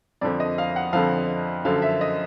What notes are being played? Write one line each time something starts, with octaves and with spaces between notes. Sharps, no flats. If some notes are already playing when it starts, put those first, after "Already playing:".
F2 D3 F3 D5
D#5
F5
F#5
F2 D3 F3 F5
F#2 D3 F3 F5
E5
D#5